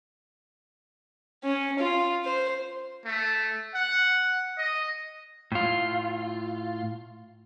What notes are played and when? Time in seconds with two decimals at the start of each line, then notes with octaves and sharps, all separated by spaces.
1.43 C#4
1.79 F4
2.25 C5
3.05 A3
3.75 F#5
4.58 D#5
5.52 A2 F4